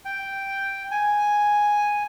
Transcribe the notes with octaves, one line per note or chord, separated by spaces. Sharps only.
G5
G#5